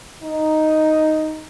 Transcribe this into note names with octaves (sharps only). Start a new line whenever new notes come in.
D#4